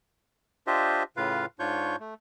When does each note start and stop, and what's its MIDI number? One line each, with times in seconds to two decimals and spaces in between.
0.67 1.03 62
0.67 1.03 65
0.67 1.03 67
0.67 1.03 72
0.67 1.03 75
0.67 1.03 76
1.17 1.46 45
1.17 1.46 49
1.17 1.46 65
1.17 1.46 71
1.17 1.46 77
1.59 1.96 44
1.59 1.96 62
1.59 1.96 65
1.59 1.96 73
1.59 1.96 85
1.59 1.96 91
2.00 2.14 57